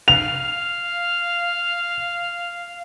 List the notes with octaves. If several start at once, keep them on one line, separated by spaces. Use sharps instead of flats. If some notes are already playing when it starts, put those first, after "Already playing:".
F5 F7